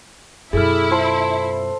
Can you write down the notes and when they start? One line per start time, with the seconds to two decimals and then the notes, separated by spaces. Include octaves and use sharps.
0.53 F#2 B2 E4 G#4 A4 F6
0.91 F4 A4 C5